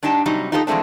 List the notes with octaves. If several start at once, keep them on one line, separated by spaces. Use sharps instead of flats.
G2 D4 D#4 G4 A5
C3 F#3 G3 D#4
D#4 F4 G4 A4 B4 D#5
E3 F3 G#3 A3 C4 D4